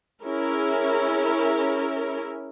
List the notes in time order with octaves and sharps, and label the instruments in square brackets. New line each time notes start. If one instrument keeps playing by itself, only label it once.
[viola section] C#4 E4 G#4 A#4